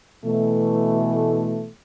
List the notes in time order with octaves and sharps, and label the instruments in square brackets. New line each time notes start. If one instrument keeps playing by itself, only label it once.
[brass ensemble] B2 E3 A3